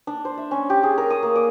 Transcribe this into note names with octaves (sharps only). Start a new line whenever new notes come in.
D4
C5
E5
C#4
G4
G#4
A#4
D#6
A#3
D5